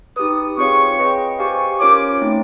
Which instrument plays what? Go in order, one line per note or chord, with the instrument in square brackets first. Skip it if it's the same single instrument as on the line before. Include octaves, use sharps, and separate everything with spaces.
[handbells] D#4 G4 B4 [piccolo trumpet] D#6
[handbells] C4 F4 G#4 C#5 F5 [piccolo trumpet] C#6
[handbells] G#4 B4 D#5 G5
[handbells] G4 C5 F5 G#5 [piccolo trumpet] C#6
[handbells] C#4 F4 A#4 C#5 [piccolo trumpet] D6
[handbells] A3 C4 D#4